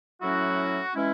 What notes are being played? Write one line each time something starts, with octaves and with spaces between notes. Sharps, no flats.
A2 F#3 C#4 E4 F#4
E3 G#3 C#4 E4